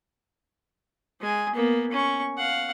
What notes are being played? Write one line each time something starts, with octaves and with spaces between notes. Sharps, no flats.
G#3 G#5
A#3 B3
C#4 C#6
F5 F#5